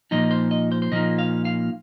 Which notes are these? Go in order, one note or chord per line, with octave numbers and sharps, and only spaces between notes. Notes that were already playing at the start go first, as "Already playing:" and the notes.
A#2 F3 A#3 D#4 D#5
C5
D#5
C5
C5
A#2 F3 A#3 D#4 D#5
F5
F5